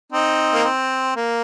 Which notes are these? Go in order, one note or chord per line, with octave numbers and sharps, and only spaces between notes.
C4 D#4
A#3
C4
A#3